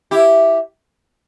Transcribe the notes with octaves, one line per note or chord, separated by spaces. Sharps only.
E4 G4